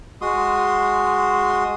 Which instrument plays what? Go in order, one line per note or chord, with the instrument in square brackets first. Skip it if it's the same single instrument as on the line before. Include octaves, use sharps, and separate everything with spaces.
[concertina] G#3 F#4 C6 D#6